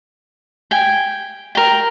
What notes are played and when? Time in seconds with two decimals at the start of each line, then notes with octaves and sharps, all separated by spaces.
0.71 G5 G#5
1.55 A#4 G5